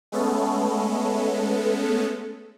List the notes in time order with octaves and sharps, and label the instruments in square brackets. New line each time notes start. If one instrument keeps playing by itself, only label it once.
[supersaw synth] G#3 A3 B3 C#4 A4